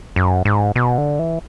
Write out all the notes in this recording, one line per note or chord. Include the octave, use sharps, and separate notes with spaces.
F#2
G#2
B2
D3
E3